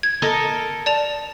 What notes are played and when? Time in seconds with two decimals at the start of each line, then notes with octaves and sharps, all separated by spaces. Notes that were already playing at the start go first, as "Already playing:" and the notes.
0.03 G#6
0.22 A4 A#4 D#5
0.86 D5 A5 F7